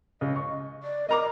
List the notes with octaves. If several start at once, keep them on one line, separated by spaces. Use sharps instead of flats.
C#2 D#5
C#6
D5
A#4 D#5 A#5 D6